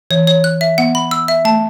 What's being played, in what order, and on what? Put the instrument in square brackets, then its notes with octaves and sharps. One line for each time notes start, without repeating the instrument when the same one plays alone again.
[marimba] E3 [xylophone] C#5
[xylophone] C#5
F#6
E5
[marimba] B3 [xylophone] F#5
[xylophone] B5
E6
E5
[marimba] A3 [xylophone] A5